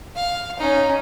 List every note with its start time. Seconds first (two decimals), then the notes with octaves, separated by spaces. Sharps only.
0.16 F5
0.59 C#4 D#4